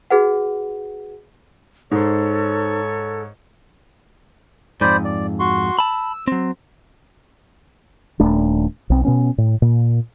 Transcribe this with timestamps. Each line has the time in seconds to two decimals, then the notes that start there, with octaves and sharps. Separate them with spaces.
0.10 F#4 G#4 B4 F#5
1.92 G#2 D#4 A4 C5 C#5
4.81 F2 G#2 C5 D5 B5
5.05 D5
5.40 F#4 C6 C#6
5.79 A5 B5 E6
6.28 F#3 C4
8.20 D#1 A3 D4
8.90 B1 C4
9.05 B2 B3 C#4
9.38 A2
9.62 A#2